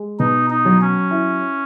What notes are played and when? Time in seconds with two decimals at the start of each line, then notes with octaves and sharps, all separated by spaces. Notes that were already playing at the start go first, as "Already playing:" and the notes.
Already playing: G#3
0.19 B2 D#4
0.50 D#4
0.65 F#3
0.81 C#4
1.11 E4